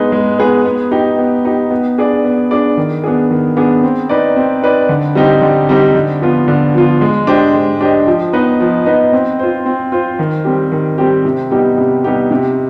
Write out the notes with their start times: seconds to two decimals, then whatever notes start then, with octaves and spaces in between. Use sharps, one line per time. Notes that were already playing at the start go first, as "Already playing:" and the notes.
Already playing: G#3 B3 D#4 G#4 B4
0.12 G#3
0.39 B3 D#4 G#4 B4
0.66 B3
0.91 D#4 G4
1.18 B3
1.45 D#4 G4
1.71 B3
1.98 D4 G#4 D5
2.24 B3
2.51 D4 G#4 D5
2.77 D#3
3.04 B3 D4 G#4
3.31 D#3
3.57 B3 D4 G#4
3.83 C4
4.09 D#4 B4 D5
4.36 C4
4.62 D#4 B4 D5
4.89 D3
5.15 G3 C4 D#4 G4
5.42 D3
5.69 G3 C4 D#4 G4
5.94 D3
6.21 F3 B3 F4
6.48 D3
6.74 F3 B3 F4
7.01 G#3
7.27 D4 G4 C5 D#5
7.54 G#3
7.81 D4 G4 C5 D#5
8.07 F3
8.33 B3 D#4 B4 D#5
8.60 F3
8.86 B3 D#4 B4 D#5
9.13 C4
9.39 F4 C5
9.66 C4
9.92 F4 C5
10.19 D#3
10.45 G3 C4 G4
10.72 D#3
10.98 G3 C4 G4
11.25 C3
11.51 G3 B3 D#4 G4
11.78 C3
12.04 G3 B3 D#4 G4
12.31 C3